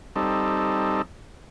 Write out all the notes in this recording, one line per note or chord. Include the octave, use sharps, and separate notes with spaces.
G3 C4 D#4 A4